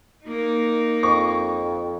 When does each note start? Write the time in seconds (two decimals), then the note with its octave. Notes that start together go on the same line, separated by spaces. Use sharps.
0.24 A#3 D#4
1.03 F2 C#6